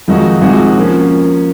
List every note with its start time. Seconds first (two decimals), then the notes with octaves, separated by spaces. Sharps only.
0.08 F2 D#3 G#3 D#4 F#4
0.42 C3 F3 G#3 D#4 F#4
0.77 F3 A#3 C#4